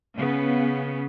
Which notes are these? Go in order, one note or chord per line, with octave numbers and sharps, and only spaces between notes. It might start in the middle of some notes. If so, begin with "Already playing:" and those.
C#3 B3